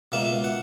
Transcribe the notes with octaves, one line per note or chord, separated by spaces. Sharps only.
C#2 B2 A#3 E5
F#5